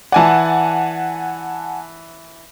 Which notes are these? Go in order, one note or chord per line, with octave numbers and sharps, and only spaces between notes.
E3 D5 F#5 G#5 A5